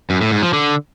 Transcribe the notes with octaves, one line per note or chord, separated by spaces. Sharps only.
F#2
A2
G#2
F3
D3